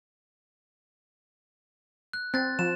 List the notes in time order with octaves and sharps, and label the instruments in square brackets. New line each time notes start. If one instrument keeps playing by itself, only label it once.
[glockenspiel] F#6
[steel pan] C4 [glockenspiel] F#6 A6
[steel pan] F3 [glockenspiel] E7